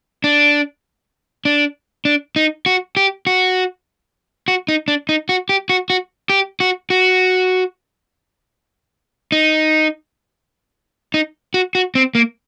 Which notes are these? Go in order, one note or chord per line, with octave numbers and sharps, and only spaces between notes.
D4
D4
D4
D#4
F#4
G4
F#4
F#4
D#4
D4
D#4
F#4
G4
F#4
F#4
G4
F#4
F#4
D#4
D#4
F#4
F#4
C4
A#3